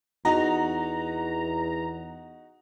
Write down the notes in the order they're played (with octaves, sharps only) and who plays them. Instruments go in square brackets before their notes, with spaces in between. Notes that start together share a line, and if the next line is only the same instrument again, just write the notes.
[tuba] E2 [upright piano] D#4 F#4 [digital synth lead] A#5